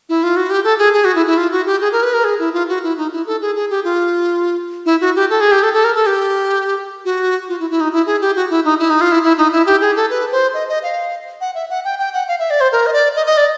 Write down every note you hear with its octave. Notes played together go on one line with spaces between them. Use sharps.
E4
F4
F#4
G4
A4
G#4
G#4
F#4
E4
E4
F4
F#4
G4
G#4
A#4
B4
A#4
G#4
E4
F4
F#4
E4
D#4
E4
A4
G#4
G#4
G4
F4
E4
F#4
G4
A4
G#4
G4
A4
A4
A#4
A4
G4
F#4
F4
E4
E4
D#4
E4
G#4
G4
F#4
E4
D#4
E4
D#4
F4
E4
E4
D#4
E4
G4
G#4
A4
B4
C5
D#5
D#5
F5
F#5
E5
F#5
G5
G5
F#5
F5
E5
D5
C5
A#4
D#5
D5
D#5
D#5
D5